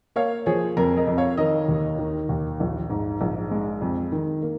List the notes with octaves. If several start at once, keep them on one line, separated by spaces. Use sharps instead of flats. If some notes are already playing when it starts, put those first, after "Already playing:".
A#3 C#5 F5
F3 G#4 C#5
F2 A#4
A#4 D#5
F2
C#5 F5
D#3 A#4 D#5
D#2
D#3
D#2
A#1
G#2
A#1
G#3
F2
D#3
A#3